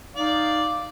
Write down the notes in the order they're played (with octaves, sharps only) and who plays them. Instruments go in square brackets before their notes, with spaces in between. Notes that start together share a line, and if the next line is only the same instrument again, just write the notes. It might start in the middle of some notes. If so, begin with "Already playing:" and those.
[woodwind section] D#4 F5 [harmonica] D5